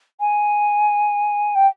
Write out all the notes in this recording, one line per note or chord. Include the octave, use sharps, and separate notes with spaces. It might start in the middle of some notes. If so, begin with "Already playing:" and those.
G#5
G5